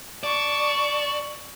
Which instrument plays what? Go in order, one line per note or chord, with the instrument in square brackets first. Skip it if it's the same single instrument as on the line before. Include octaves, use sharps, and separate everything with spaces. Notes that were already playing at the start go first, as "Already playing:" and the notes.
[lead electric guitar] D5 [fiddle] A5 C#6